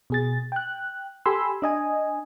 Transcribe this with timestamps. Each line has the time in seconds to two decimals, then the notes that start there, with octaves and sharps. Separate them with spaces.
0.10 B2 G#4 A6
0.52 G5 F#6
1.26 G4 A4 G#5 B5 C6 E6
1.62 D4 D#5 G#5